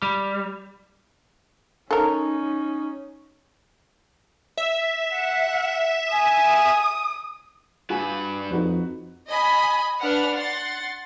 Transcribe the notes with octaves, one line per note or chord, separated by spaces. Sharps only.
G3
C#4 D#4 A4 A#4
E5
F#5
G#5 D#6
G2 F#4 B4 G#5
F2 D#4 F#4 B4
D#5 G#5 B5
D4 B4 F#5 F6
F#5 C6 A6